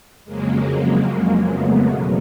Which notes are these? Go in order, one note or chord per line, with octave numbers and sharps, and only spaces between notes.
F2 C#3 F#3 G#3 A#3
G#3 A#3
A3 B3
E2 B2 F#3